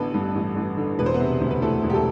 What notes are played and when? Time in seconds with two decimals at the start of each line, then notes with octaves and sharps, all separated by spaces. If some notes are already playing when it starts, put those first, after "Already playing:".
Already playing: A1 D3 B3 A4 B4
0.14 G2
0.35 A1
0.56 A1
0.77 D3
0.99 E1 B4
1.06 C5
1.14 B3 B4
1.20 C3
1.41 D2
1.51 B4
1.62 E3 A3 A4
1.83 E1
1.90 G4
1.94 A3 A4